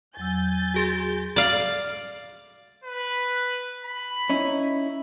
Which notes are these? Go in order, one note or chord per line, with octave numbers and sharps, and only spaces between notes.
E2 F#3 G#5 E6 G6 A6
F#4 G#4 C6
D5 F5
B4
B5
C#4 D#4 E4